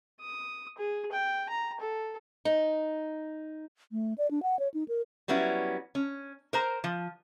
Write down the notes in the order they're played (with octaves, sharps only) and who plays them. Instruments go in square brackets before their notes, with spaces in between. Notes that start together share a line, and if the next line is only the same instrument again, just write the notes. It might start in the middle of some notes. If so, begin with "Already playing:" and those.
[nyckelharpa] D#6
G#4
G5
A#5
A4
[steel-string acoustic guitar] D#4
[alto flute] A3
D5
D4
F#5
C#5
D#4
A#4
[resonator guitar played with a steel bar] F#3 G3 B3 C#4 E4
C#4
A#4 C5 A#5
F3